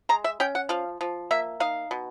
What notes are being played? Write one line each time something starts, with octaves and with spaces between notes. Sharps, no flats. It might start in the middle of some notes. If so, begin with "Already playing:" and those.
G#3 A#5
E5
C#4 G5
F#5
F3 F5
F3
A#3 E5
D#4 F5
B2